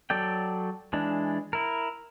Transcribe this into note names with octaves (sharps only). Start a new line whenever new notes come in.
F#3 A4 D5 G5
E3 G#3 D4
E4 A#4